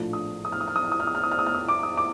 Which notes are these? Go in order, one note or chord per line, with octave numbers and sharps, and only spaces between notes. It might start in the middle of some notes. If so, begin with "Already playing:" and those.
Already playing: A#1 A2 F3 A3 D4
D#6
D#6
F6
D#6
F6
D#6
F6
D#6
F6
D#6
F6
D#6
F6
D#6
F6
D#6
D6
D#6
D6